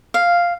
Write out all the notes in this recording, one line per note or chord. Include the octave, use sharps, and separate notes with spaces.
F5